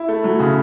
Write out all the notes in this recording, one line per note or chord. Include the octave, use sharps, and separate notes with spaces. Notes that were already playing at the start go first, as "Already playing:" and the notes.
Already playing: E4
A3
F#3
C#3